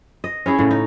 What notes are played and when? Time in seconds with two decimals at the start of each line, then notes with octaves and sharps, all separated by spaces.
0.24 D#5
0.46 C#4 E4 G#4
0.59 A2 C#3
0.71 D#4